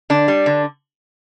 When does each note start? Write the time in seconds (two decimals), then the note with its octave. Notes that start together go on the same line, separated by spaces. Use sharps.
0.10 D3 D4
0.28 G3
0.46 D3